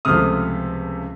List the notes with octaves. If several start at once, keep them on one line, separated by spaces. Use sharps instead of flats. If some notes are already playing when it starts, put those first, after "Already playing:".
C#2 C3 F3 A3 D#6 F6